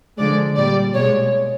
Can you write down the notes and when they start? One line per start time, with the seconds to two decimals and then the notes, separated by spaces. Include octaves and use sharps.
0.19 D3 F3 G#3 D5
0.57 A#2 G3 D5
0.95 B2 G#3 C#5